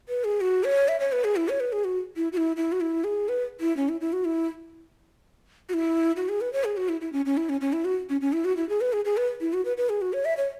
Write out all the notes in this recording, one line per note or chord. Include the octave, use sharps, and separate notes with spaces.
B4
G#4
F#4
C#5
E5
C#5
B4
G#4
E4
C#5
B4
G#4
F#4
E4
F#4
E4
E4
F#4
E4
G#4
B4
E4
C#4
E4
E4
F#4
E4
F#4
E4
F#4
G#4
B4
C#5
G#4
F#4
E4
E4
C#4
C#4
E4
C#4
C#4
E4
F#4
C#4
C#4
E4
F#4
E4
G#4
B4
G#4
G#4
B4
E4
F#4
B4
B4
G#4
F#4
C#5
E5
C#5